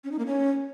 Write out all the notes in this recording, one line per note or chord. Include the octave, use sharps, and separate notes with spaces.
C#4
D#4
A#3
C#4